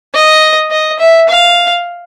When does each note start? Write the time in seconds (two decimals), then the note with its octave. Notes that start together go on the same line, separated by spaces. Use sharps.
0.14 D#5
0.71 D#5
0.99 E5
1.29 F5